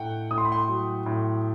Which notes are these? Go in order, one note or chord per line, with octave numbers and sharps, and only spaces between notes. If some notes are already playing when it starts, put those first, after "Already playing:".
Already playing: A2 A3 F#5 G5
A2 D#6
C6
B5
C6
F#3
A2